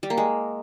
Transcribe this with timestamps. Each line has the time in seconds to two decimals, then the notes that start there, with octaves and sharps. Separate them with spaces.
0.03 G3
0.10 A#3
0.18 G#3